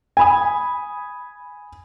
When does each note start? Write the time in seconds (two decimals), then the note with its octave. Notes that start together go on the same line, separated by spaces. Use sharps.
0.17 G#5 B5 D#6